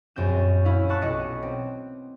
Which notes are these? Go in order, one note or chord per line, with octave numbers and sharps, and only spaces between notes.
A#1 F#2 C4 G6 E7
C#4 E4 F5
E4 A5 C#6 F#6 E7
B1 D#5 C#7
C4